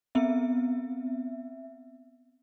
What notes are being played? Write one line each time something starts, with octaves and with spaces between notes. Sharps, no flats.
B3 C4 E5